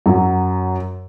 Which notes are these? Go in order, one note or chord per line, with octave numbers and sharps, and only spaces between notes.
F#2 F#3